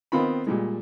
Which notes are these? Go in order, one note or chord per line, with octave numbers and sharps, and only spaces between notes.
D#3 B3 C4 F4 B5
A#2 G3 G#3